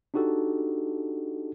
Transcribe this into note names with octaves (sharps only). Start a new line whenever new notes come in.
D4 D#4 F#4 G4 A4